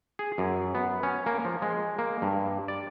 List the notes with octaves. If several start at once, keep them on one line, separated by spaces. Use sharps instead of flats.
G#4
F#2
B3
C#4
A#3
F3
G#3
A#3
G2
D5